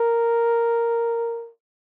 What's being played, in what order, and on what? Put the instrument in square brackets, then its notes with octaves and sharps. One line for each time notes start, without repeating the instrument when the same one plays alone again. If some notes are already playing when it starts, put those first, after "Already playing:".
Already playing: [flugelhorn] A#4